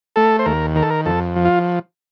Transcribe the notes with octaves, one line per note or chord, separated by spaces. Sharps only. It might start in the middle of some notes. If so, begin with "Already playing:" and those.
A3 A4
C5
D#2 A#4
D#3 A#4
A4
A#4
F2 A4
F3
F4